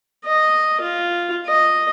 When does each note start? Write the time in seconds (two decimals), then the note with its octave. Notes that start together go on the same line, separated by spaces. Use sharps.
0.25 D#5
0.81 F4
1.47 D#5